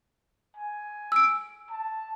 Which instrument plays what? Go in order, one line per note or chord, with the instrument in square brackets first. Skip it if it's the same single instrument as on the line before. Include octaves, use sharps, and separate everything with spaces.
[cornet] G#5
[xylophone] E6 D7
[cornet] A5